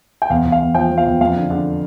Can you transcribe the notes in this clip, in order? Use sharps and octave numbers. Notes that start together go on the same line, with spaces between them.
G5
E2 F5
E2
F5
E2
F3 G5
F3
F5
E2
F2 F5
D3
D3